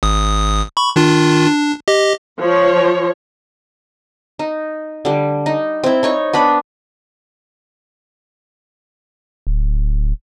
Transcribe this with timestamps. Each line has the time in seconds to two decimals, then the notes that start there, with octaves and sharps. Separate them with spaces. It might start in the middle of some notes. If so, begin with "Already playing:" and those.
0.03 G#1 D#6
0.77 B5 C#6
0.96 D#3 D4 F4
1.47 D4
1.88 G4 D#5
2.40 F3 C#5
4.39 D#4
5.05 D3 G3
5.46 D#4
5.84 C4 E4
6.03 D#4 C#5 C#6
6.33 B3 D4 B5
9.47 D1